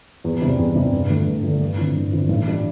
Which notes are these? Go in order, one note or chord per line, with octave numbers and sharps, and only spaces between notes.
E2
C3 G3
E2
C3 G3
G2
D3 A3
G2
D3 A3
G2
D3 C4 E4
G2
D3 C4 E4
A1
G3 D4